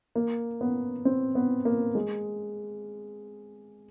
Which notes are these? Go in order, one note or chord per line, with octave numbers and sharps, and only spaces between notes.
A#3
B3
C4
B3
A#3
G#3